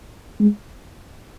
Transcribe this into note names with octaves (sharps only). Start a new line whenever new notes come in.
G#3